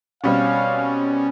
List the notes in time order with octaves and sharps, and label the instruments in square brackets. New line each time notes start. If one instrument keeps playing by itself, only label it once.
[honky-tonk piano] B2 G3 C4 [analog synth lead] C#4 [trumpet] F5